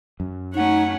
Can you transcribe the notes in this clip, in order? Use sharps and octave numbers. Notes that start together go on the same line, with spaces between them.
F#2
A3 C#4 D#4 F#5